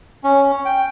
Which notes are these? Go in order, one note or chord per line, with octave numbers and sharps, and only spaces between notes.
C#4
G5